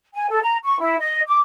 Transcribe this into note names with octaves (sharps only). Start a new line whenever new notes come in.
G#5
A4
A#5
C#6
E4
D#5
D6